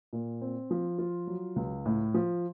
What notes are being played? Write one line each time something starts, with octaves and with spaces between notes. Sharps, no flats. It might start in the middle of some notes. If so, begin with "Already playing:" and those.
A#2
C4
F3
F4
F#3
C#2
A2
F3